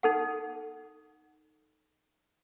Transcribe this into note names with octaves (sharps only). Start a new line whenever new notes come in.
D#4 A4 F#5